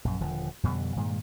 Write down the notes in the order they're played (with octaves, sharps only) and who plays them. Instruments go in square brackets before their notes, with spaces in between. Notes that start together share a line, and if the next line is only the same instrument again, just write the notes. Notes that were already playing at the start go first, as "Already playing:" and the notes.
[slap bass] A#1 F#2
D#1 D3 F3
F2 B2 D3 G3
G2 A#2 D#3 G#3